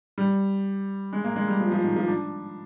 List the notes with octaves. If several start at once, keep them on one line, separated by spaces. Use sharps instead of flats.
G3
G#3
A#3
G#3
G3
F3
F3
D#3
F3
D4